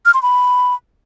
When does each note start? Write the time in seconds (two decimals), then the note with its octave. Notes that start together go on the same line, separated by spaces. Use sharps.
0.06 F6
0.14 C6
0.22 B5